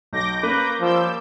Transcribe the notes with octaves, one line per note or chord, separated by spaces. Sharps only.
B1 D6 G6 A#6
A#3 C#4 B4
F3 G3 D6 E6 G6